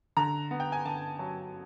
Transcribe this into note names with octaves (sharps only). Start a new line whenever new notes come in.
D3 A#5
B3
G5
G#5
D3 A5
F#3